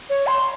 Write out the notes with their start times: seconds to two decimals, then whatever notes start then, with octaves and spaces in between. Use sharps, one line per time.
0.10 C#5
0.27 C6